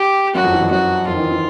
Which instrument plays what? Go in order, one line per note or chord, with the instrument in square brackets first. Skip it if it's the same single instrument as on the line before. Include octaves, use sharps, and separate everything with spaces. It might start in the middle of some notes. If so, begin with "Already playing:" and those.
Already playing: [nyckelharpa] G4
[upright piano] F#2 F#3 [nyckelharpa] F#4
[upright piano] F2 F3
E3
F2 F3
[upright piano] F#2 F#3 [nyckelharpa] F#4
[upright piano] F2 F3 [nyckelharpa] F4
[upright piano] D#3
E3
E3